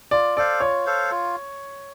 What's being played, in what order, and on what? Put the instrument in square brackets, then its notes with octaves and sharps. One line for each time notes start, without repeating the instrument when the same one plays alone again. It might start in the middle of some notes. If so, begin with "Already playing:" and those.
[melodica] F4 [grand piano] D5
[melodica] A4 C5 F5 [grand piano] D5
[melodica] F4 [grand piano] C#5
[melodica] A4 C5 F5
F4